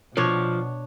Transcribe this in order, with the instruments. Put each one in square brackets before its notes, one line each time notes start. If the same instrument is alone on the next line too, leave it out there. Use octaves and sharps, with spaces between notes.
[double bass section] B2 [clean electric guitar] F3 [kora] D4 C#5